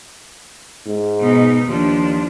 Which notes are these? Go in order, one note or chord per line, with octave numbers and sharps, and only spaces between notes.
G#2
B2 D#4
D#2 F3 D4